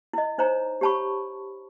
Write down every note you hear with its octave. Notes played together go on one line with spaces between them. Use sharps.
E4 D#5
D#4 C5 C#5 A#5
G4 C#5 A5 B5 C#6